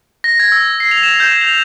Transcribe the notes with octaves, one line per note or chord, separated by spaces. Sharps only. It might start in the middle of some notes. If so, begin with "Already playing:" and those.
A#6
G#6
E6
C7
F7
E7
G6
F7